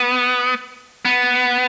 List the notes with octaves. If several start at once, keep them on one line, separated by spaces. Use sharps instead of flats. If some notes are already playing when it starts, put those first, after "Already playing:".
Already playing: B3
B3